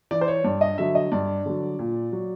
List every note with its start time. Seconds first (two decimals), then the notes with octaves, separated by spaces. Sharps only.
0.11 E3 D5
0.21 C5
0.28 C#5
0.44 G2 D5
0.61 D#5
0.78 D3 F#3 E5
0.95 D#5
1.12 G2 D5
1.46 D3 F#3
1.79 A#2
2.12 F#3